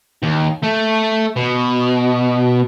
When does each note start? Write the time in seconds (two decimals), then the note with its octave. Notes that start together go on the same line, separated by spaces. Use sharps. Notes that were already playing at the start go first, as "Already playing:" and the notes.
0.23 D#2
0.63 A3
1.36 B2